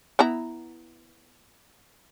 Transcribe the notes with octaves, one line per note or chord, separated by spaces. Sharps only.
B3 E4 A#5